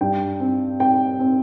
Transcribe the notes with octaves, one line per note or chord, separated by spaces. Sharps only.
G2 G5
C4
C4 G5
C4